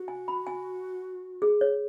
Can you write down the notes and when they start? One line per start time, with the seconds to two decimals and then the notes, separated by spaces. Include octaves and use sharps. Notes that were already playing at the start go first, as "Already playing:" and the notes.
Already playing: F#4
0.08 G#5
0.28 B5
0.47 G#5
1.42 G#4
1.61 C#5